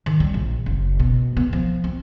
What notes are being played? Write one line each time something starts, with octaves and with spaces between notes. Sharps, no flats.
D#3
G3
A#1
F#1
B2
B3
F3
C4